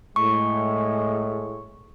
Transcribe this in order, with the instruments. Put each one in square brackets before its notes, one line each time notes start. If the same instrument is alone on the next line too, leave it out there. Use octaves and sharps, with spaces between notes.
[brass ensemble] A2 G#3 [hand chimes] C#6